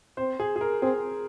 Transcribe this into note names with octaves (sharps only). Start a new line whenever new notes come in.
C4 C5
G#4
G#4
A#4
C4 G#4